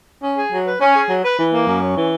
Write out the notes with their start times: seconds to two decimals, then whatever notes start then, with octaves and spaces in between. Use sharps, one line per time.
0.22 C#4
0.37 G#4
0.51 F#3
0.65 B4
0.80 C#4
0.95 G#4
1.09 F#3
1.23 B4
1.38 E3
1.52 A#3
1.67 F#2
1.82 C#4
1.97 E3